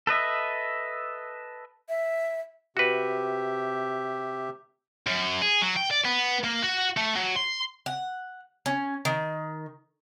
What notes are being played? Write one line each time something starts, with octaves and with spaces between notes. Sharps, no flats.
A4 B4 D#5 E5
E5
C3 F#4 G4 B4 E5
F#2
G#4
F#3
G5
D5
B3
A#3
F#4
A3
F#3
C6
F#5
C#4
D#3